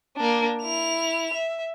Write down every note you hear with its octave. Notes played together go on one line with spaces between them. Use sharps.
A#3 D4
E4 F7
E5